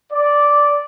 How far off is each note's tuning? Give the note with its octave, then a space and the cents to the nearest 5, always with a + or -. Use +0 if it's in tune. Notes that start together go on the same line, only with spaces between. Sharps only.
D5 -5